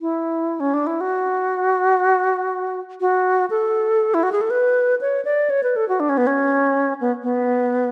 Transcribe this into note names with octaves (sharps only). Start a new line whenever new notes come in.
E4
C#4
D4
E4
F#4
F#4
A4
E4
F#4
G#4
A4
B4
C#5
D5
C#5
B4
A4
F#4
D4
C#4
B3
C#4
B3
B3